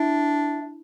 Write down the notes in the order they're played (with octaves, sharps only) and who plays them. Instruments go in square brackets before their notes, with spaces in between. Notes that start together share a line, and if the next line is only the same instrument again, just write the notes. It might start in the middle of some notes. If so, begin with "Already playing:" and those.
Already playing: [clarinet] D4 [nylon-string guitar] E4